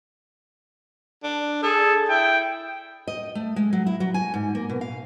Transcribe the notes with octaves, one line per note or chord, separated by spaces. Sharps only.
D4
G#4 A4
E4 G5
D#5
A3
G#3
F#3
E4
F#3
G#5
G#2
A#3
B2
F5